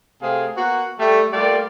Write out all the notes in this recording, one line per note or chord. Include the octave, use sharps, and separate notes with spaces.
C3 A3 C4 G#4 F5
A#3 B3 F#4 F#5
G3 A3
G3 A3 A#3 F4 D5